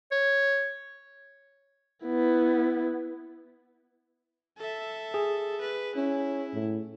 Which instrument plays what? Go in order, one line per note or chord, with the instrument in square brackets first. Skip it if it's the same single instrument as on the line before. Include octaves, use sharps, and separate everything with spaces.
[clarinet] C#5
[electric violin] B3 E4
A4 E5
[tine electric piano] G#4
[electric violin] B4
[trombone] C#4 [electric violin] E4
[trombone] A2